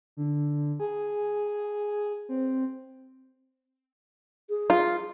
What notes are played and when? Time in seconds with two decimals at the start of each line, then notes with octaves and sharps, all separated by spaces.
0.17 D3
0.80 G#4
2.29 C4
4.49 G#4
4.70 F4